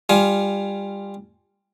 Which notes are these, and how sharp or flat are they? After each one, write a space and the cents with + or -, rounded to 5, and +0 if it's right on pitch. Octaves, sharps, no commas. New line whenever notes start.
G3 +20 F4 +0 G#5 +15